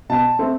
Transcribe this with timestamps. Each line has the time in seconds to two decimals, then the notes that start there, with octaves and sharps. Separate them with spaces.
0.10 B2 A5
0.39 A3 C4